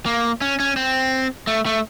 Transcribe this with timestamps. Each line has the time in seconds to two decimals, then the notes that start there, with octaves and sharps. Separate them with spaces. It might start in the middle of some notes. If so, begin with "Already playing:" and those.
0.06 A#3
0.41 C#4
0.60 C#4
0.76 C4
1.47 A3
1.66 A3